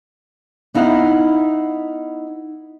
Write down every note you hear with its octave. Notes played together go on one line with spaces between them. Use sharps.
B3 D#4 E4 F5 F#5